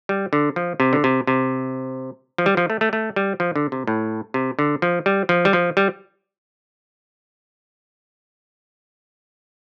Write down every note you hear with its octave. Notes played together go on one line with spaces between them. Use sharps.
G3
D3
F3
C3
D3
C3
C3
F3
G3
F3
A3
A3
A3
G3
F3
D3
C3
A2
C3
D3
F3
G3
F3
G3
F3
G3